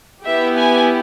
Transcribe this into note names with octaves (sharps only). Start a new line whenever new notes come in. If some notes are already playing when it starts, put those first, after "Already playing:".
B3 E4 G4 E5
G#5